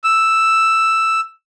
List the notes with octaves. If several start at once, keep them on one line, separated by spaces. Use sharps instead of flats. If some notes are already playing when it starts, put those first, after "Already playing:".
E6